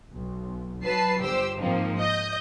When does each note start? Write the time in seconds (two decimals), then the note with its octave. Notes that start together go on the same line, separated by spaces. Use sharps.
0.11 B1
0.82 F#3 B4 A5 C7
1.21 G1 G4 C5 E6
1.59 G#2 F3 A#3 C4 D#4
1.98 D#5 G6